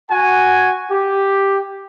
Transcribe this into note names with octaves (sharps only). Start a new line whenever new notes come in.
F#4 F#5 G#5
G4